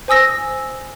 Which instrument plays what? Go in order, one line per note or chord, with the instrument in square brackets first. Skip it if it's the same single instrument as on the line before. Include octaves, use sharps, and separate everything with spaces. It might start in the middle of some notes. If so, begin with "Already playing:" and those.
[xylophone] C5 G#5 D#6 E6 A#6